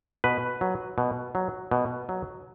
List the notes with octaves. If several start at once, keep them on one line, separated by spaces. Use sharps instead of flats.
B2 B4
F#3
B2
F#3
B2
F#3